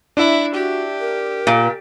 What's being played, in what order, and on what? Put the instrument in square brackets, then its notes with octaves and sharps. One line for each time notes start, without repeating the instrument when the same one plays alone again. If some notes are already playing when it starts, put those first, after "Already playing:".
[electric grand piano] D4 E5 [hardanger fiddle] E4
[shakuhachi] F#4 [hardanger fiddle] G4
[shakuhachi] A#4
[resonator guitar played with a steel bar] A#2